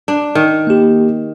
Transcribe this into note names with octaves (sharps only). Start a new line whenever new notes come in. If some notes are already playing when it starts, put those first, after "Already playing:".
D4
D#3
A#3 G4